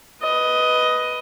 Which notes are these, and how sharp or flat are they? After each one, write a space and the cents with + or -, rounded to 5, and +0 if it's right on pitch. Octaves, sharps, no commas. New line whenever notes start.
B4 +0 D#5 +10